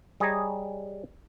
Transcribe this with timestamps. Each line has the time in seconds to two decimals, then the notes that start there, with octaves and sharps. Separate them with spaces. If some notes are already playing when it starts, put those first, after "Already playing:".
0.20 G3 G#4 C#5 D#5 G#5 A#5